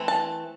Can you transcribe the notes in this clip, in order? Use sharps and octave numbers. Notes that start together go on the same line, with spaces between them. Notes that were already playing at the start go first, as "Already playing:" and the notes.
Already playing: E3 A3 C4
A5